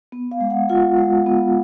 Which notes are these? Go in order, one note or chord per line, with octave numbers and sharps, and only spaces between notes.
B3
F5
G#3
F#5
F4 F#5
G#3
B3